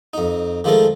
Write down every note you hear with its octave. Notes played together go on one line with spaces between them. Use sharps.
F2 D#4
D#3 F3 G#3 A3 A4 A#4